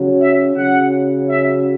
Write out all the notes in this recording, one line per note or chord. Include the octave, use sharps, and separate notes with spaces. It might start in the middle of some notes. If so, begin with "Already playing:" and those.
Already playing: C#3 F#3
E5
C#3 F#3 F#5
E5